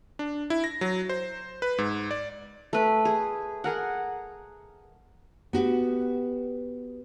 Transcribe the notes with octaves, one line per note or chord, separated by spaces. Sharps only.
D4
E4
A#6
F#3
C5
B4
G#2
D5
A3 B4
G#4
G#4 A#4 F#5
B3 F#4 G4